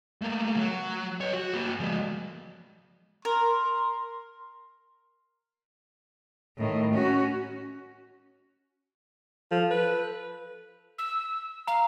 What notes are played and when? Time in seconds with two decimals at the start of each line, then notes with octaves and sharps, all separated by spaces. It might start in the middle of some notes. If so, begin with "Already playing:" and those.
0.22 A3 A#3
0.57 F#3
1.21 B4 C#5
1.34 F#4
1.54 A#3 F#4
1.80 F3 G#3
3.25 A#4 C6
6.58 A2 D#3
6.93 C#4 F#4
9.51 F3 A4
9.71 B4
10.98 E6
11.67 F5 A#5